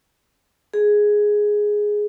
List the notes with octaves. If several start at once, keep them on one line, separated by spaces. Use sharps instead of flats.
G#4